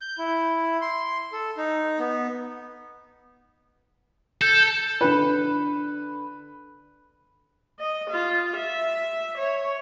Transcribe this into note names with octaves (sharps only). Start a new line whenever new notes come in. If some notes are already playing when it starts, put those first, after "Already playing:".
G6
E4
C6
A4
D#4
B3
A4 G6
D3 B4
D#5
F4
E5
C#5